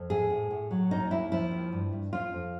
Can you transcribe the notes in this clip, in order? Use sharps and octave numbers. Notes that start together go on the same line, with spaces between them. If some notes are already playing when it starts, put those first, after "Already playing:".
Already playing: F2
A2 G#4
A2
A2
F#3
D#2 D#4
D#2 E4
F3 E4
D#2
G2
G2
F2 F4
F2